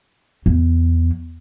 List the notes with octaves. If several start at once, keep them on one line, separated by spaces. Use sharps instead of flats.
E2